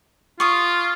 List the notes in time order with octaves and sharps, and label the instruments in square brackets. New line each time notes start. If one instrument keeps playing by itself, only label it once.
[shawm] F4 [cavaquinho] C#6 D#6